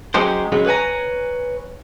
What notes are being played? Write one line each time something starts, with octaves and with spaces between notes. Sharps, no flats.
F#3 G#3 C#4 G4 C5
C#3 F#3 G#3
B4 C#5 G#5 A#5